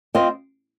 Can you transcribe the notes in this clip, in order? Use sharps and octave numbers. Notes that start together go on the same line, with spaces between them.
C4 F4 C5 D#5